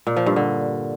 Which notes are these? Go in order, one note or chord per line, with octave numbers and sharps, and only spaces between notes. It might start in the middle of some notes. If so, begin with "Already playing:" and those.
A#2
F3
G2
D3